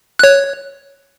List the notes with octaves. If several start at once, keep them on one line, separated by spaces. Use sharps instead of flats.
C#5 F#6